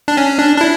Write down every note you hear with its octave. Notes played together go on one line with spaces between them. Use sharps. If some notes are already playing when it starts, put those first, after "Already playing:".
D4
C#4
D4
D4
E4